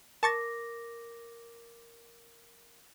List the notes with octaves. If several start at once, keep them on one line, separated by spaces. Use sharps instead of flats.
A#4 A5 C#6 D6 A6 A#6